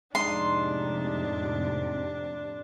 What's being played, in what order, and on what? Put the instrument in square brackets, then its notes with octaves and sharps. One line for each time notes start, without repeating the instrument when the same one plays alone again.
[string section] F2 A2 C3 [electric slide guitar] G#3 D#4 [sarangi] D4 [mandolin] C6